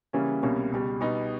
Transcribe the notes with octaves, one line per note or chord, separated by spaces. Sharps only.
C#3 E3 G3 A#3 C#4
C2 B2 G3 A#3 C#4
C#2 B2 G3
B2 G3 B3 D#4